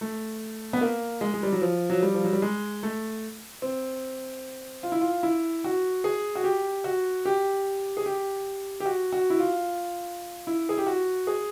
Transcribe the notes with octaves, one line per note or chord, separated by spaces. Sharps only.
A3
B3
A#3
G#3
G#3
G3
F#3
F3
F#3
G3
F3
F#3
G3
G#3
A3
C4
F4
E4
F4
E4
F#4
G#4
F#4
G4
F#4
G4
G#4
G4
G4
F#4
F#4
E4
F4
E4
G#4
G4
F#4
G#4